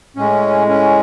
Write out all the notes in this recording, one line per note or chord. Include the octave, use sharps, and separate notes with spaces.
A2 G#3 C#4
C#4